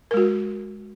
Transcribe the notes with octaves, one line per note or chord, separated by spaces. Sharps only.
G#3 F#4 A#4